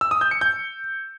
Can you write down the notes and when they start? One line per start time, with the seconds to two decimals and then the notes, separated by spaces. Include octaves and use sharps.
0.01 E6
0.11 D#6
0.21 G6
0.31 C#7
0.41 G6